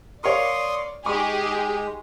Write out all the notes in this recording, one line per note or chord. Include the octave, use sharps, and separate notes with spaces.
A#4 C#5 D5 F5 C6 C#6 D#6
G#3 D#4 G4 G#4 C#6